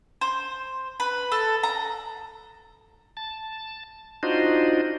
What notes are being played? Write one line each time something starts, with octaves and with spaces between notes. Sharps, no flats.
C5
B4
A4
A#5
A5
D4 D#4 F4 F#4 C5 D#5